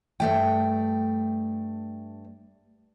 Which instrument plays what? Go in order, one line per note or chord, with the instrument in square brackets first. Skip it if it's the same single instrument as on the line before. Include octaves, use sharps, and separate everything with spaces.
[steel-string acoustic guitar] G2 A3 G5